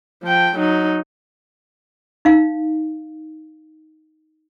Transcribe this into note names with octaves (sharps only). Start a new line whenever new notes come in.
F3 G5
F#3 D#4
D#4 F5